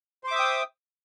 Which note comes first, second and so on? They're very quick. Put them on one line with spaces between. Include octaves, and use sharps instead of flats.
C5 D6 E5 D#6 G5